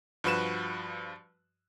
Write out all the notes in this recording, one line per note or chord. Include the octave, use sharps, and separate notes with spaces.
G2 F3 F#4 B4 F#6 E7